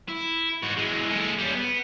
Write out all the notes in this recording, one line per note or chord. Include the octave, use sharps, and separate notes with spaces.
E4
G#2 F#4
E3 G#3
G#3 A4
G3 C#4
B3